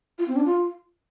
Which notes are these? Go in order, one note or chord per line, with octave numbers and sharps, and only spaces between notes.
F4
C4
D4
F4